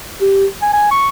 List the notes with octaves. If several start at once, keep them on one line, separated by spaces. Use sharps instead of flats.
G4
G#5
G#5
C#6